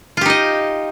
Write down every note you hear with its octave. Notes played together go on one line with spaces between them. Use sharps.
D#4 F4 G4 D#5